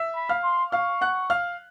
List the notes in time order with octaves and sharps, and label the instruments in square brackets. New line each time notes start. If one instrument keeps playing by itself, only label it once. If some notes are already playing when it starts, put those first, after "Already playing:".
Already playing: [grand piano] E5 E6
[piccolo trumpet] B5
[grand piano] F5 F6
[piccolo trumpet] C6
[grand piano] F5 F6 [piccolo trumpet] C#6
[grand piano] F#5 F#6
F5 F6